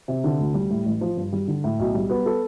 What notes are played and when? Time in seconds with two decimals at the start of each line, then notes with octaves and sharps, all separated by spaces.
0.08 C3
0.24 D3
0.40 D2
0.54 G3
0.71 A2
0.86 A1
1.01 F3
1.17 G2
1.33 G3
1.48 D3
1.64 A2
1.79 B1
1.95 G3
2.10 B3
2.26 A4